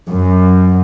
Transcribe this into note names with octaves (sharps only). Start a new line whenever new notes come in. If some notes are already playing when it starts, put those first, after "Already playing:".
F#2